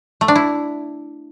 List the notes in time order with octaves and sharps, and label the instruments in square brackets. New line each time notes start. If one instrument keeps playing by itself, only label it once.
[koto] A3
D4
E4